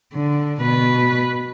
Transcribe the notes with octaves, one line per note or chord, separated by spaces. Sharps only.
D3
B2 B4